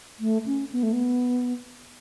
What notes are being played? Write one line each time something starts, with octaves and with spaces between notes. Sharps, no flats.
A3
C#4
B3
A3
B3